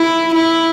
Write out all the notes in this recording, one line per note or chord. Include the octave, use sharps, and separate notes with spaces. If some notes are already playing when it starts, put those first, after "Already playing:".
Already playing: E4
E4